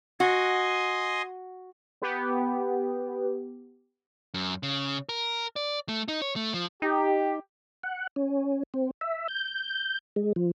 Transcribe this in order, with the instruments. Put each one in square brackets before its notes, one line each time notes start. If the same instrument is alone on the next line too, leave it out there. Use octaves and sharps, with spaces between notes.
[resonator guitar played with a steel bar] F#4 [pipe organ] D#5 G#5 C6
[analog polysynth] B3 G4
[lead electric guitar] F#2
C#3
A#4
D5
A3
D#4
C#5
A3
F3
[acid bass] D#4 [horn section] G4
[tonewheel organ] F#5
C#4
C4
E5
G6
G#3
F3